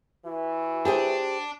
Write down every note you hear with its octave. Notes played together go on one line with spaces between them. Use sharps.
E3 F#4
D4 G4 G#4 C5